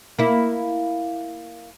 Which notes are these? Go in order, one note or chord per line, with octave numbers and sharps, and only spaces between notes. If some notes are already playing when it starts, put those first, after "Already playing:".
A#3 E4